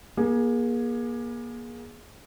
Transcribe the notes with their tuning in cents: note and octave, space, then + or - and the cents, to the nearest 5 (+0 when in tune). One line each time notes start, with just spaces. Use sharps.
A#3 +35 G#4 +0